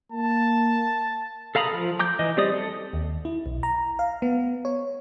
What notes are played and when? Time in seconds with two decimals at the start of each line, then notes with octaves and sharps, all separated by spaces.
0.12 A#3 A5
1.55 A4 F5 A#5 B5 D#6
1.73 F3
1.99 A#5 D6 G6
2.19 E3 D#5
2.37 G3 C4 G4 D5 D#6
2.52 A4
2.93 D#2
3.25 E4
3.46 B1
3.63 A#5
3.99 F5
4.22 B3
4.65 C#5